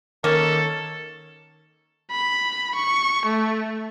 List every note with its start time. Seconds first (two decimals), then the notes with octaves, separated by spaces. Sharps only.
0.24 D#3 A#3 C#4 A4
2.11 B5
2.76 C#6
3.27 A3